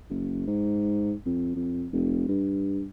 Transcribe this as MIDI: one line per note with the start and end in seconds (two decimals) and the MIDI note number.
0.10 0.44 30
0.47 1.14 44
1.26 1.52 41
1.56 1.88 41
1.93 2.27 29
2.28 2.85 43